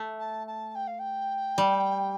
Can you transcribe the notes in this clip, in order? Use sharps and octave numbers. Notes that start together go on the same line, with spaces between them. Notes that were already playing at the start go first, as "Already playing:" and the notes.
Already playing: A3
A5
A5
G5
F5
G5
G3